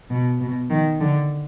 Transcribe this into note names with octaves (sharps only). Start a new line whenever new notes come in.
B2
B2
D#3
D3